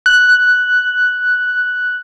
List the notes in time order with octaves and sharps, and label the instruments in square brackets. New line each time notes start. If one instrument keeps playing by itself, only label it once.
[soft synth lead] F#6